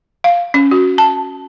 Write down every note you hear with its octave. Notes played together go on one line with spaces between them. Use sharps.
F5
C#4
F#4
A5